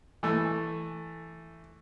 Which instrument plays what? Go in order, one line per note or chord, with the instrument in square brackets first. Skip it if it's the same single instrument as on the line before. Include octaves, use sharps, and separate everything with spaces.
[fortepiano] E3 A3